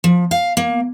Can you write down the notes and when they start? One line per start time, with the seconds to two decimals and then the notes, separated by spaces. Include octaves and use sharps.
0.04 F3
0.31 F5
0.57 A#3